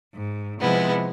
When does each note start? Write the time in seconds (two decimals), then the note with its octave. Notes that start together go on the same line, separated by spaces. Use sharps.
0.13 G#2
0.59 C3 F3 G#3 B3 E4